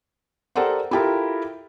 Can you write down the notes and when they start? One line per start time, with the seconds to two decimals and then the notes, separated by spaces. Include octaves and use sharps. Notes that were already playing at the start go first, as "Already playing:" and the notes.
0.56 G4 A4 A#4 C5 D5 F#5
0.91 E4 F4 G4 A4 A#4